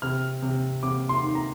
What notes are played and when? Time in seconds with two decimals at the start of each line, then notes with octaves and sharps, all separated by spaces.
0.02 C3 F6
0.42 C3
0.83 C3 D6
1.09 C6
1.22 D#3
1.35 A#5